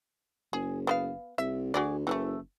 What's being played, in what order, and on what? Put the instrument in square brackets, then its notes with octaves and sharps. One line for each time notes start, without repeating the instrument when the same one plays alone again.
[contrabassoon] F#1 [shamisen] G#4
[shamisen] B3 B4 F5
[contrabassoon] C2 [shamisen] E5
[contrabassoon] D2 [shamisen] F#4 G#4 D5
[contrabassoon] F#1 [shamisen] E3 G3 A3